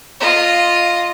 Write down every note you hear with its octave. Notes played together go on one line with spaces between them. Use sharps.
F4 D#5